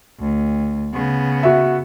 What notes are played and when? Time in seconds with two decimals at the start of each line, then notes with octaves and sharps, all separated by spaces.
0.20 D2
0.94 C#3 B3
1.43 F#4 E5